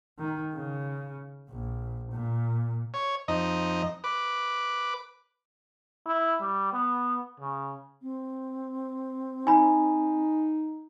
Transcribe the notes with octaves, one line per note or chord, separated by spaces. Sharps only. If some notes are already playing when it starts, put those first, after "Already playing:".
D#3
C#3
A#1
A#2
C#5
F2 D#4 D#5
B4 D6
E4
G3
B3
C#3
C4
D#4 G#5 B5